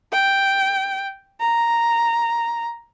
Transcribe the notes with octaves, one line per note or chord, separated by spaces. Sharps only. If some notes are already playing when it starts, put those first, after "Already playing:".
G5
A#5